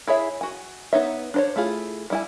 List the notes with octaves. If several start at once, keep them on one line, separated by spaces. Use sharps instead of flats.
E4 G#4 C#5 E5
F#4 G#5
B3 D#4 C#5 E5
D4 C5 C#5
A3 E4 F4 G#4
G3 E4 G#5